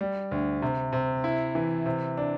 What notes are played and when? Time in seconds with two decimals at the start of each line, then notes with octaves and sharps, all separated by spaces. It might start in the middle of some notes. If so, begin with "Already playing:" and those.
0.01 G3
0.31 D2
0.62 C3
0.93 C3
1.24 E4
1.55 E3
1.86 C3
2.17 D4